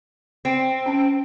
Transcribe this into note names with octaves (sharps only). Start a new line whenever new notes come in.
C4
C#4 A5